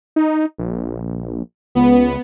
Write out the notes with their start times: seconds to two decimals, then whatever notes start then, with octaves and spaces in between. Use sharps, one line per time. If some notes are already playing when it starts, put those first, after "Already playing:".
0.16 D#4
0.58 A#1
1.75 C#2 B3